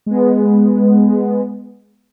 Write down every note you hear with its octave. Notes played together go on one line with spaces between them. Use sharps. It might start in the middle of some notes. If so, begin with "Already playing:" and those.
G#3 B3